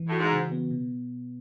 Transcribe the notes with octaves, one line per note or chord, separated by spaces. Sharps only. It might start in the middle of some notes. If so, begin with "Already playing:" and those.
Already playing: E3
A2 F#4
G#2
C#3
B3
B2